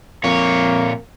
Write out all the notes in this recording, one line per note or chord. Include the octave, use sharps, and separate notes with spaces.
F2 A#2 A#3 C#5